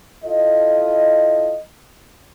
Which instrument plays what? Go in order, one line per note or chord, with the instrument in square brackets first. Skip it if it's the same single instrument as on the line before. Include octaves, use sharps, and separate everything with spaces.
[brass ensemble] E4 F4 A4 D#5